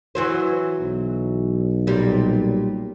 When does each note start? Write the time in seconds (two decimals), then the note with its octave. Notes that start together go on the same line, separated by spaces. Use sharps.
0.15 E3 F#3 C5
0.79 B1
1.87 A#2 G3